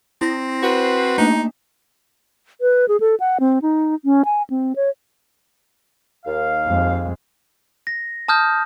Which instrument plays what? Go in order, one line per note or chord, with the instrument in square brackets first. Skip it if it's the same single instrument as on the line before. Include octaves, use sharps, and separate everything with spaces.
[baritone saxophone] C4 [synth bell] E4 A#6
[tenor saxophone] F#4 [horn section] B4 C5
[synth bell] A3 A#3 D4 [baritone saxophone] D#4
[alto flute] B4
G#4
A4
F#5
C4
D#4
C#4
G#5
C4
C#5
[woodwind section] D#2 F5
[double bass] F2 G#3
[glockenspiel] A#6
A5 D#6 F6 G6